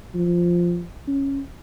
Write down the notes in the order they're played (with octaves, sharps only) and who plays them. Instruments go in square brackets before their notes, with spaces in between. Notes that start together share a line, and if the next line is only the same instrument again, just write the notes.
[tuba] F3
C#4